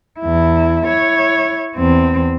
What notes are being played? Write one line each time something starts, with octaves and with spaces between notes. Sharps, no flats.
E2 E4
E4 C#5
E2 C4